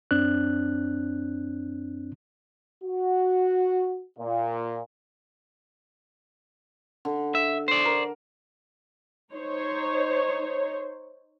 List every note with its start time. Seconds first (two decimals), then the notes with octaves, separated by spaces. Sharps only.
0.11 F#2 C4 D4 F#6
2.84 F#4
4.19 A#2
7.05 D3
7.35 E5
7.68 C5 D5
7.85 A#4
9.34 D#4 C5 C#5